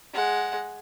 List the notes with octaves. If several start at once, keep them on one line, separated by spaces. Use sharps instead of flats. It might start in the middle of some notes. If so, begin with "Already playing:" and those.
G#3 F#5